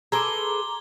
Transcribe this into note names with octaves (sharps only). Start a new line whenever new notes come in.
G#4 A4 B4 A#5 C6 D6 G#6 G7